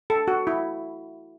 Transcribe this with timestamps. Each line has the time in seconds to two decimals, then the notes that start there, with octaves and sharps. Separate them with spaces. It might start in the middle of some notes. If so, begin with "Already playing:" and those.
0.10 A4
0.28 F#4
0.47 E4